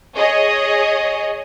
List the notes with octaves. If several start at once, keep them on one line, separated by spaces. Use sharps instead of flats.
G#4 C#5 D#5